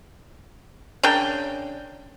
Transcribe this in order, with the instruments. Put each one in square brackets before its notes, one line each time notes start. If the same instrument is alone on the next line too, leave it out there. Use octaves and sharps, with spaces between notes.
[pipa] C#3 D4 A#4 G5